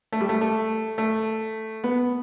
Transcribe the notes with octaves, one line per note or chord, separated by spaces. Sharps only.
A3
G3
A3
A3
A3
B3